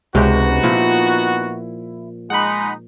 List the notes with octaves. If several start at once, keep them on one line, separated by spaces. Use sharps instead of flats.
C#2 C3 G#3 B3 D#4 F#4 G4
A#2 F3 E4
G#3 D#4 F#5 B5